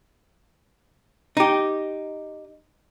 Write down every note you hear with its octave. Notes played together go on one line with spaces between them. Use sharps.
D#4 G4